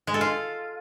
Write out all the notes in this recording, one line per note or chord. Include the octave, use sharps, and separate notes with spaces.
G#3
A4
F4